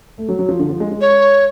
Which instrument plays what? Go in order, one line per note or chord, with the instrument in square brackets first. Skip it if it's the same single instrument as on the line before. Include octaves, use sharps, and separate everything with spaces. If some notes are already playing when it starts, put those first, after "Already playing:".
[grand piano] A3
F#3
F#3
F3
D3
F3
G#3
G#3
[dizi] C#5